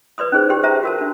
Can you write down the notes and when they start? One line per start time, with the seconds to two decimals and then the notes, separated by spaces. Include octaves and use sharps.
0.18 B4 D5 C6 D#6
0.32 C#4 D#4 G#4 C5
0.50 G4 G5 C6
0.63 C5 E5 A5 A#5
0.83 F#4 A#4 A5
0.98 D4 A5